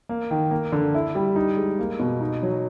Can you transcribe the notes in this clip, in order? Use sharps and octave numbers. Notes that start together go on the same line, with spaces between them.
A#3
D#3
A#3
D3
E4
G3
D#4
G#3
A#3
B2
D#4
F#3